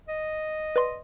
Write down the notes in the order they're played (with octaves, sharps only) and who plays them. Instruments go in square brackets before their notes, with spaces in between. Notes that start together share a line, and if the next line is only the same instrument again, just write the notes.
[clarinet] D#5
[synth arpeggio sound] B4 D5 C6